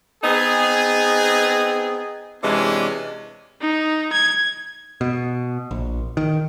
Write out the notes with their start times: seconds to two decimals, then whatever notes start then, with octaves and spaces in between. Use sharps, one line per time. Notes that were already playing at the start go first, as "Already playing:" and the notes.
0.23 B3 C4 D#4 G#4
2.43 C3 E3 G#3 C#4 D4
3.61 D#4
4.13 G#6
5.01 B2
5.71 A#1
6.17 D#3